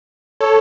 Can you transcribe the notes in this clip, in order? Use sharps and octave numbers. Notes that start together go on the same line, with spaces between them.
A4 C#5